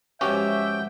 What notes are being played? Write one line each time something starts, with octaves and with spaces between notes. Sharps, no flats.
G#2 F3 B3 C#4 F#4 G4 E5 G5